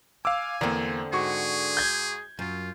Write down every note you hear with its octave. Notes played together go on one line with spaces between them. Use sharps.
F5 G#5 D6 E6
E2 D3 A#3 C4
G#2 F#4 G#4 C#6
G6 G#6
F#2 F4